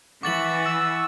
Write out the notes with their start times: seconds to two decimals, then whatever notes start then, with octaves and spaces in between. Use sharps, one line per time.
0.23 E3 F#5 C#6 D6 A6 F#7
0.65 E6